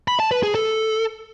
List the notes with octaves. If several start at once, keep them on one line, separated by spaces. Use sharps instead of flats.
B5
A5
B4
G#4
A4